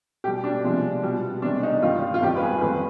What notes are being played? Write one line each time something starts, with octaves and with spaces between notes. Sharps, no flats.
B2 G3 G4
D4
C3 F3 G#3
B2 G3
C3 D#3 G#3 D4
D#4
G2 D#3 G3 F4
F4
F2 D#3 G3 G4
B4
G#4
F2 D#3 G#3 B4